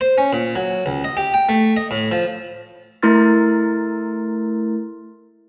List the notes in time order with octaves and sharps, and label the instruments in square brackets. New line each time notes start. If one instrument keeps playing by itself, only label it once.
[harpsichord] C5
C#4
A#2
F#3
C#2
D#5
G4
G5
A3
D#5
A2
F3
[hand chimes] A3 E4 A#4 C6 F6 A6